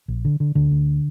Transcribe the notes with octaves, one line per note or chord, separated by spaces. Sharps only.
A#1
D3
D3
D2 D3
D2